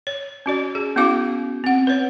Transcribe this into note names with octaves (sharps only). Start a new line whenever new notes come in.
C#5
C#4 F#4 D5
G#4
B3 C#4 E4 F#4 F5 D6
C4 F#5
B4 C#5